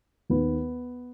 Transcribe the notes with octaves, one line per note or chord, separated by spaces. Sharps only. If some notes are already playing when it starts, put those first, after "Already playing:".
D#2 D#3 B3